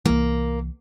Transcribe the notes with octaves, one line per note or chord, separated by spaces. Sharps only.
C2 E3 A#3